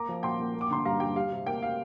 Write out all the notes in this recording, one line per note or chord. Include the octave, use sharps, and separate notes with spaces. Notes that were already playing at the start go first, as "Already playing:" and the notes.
Already playing: A#3 A#5 D6
F3
A#2 G5 C6
A#2
A#3
D6
D3 C6
G2 F5 A#5
G2 G5
G3 F5
C3
A#3 G5
F5